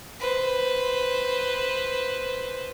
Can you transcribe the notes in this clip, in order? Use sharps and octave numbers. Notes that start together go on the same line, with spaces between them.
B4 C5